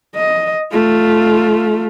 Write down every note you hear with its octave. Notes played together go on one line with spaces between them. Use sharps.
D#5
A3 F4